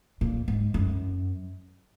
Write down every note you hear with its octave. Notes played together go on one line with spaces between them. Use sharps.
A#2
G#2
F#2